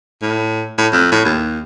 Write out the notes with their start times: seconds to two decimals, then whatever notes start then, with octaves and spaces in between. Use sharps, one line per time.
0.22 A2
0.78 A2
0.92 F2
1.12 A2
1.25 D#2